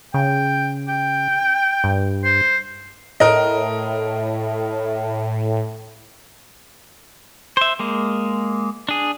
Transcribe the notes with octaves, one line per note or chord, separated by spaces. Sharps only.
C#3 G5
G5
G2
C5
A2 A#4 D#5
C5 E5
G#3 A#3
D4 G#4